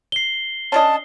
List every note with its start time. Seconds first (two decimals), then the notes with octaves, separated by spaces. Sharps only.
0.12 C7 G7
0.72 C#4 D4 D#5 A5